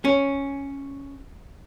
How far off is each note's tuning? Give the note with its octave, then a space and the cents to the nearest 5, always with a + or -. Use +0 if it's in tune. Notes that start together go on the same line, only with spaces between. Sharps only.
C#4 +0